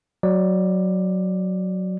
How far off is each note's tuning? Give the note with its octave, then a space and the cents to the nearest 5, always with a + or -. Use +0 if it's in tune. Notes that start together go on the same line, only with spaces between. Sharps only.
F#3 +0 D5 +15